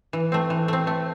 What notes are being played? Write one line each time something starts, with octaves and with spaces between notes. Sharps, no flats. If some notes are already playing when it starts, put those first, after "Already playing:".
E3
A3 C4
E3
A3 C4
A3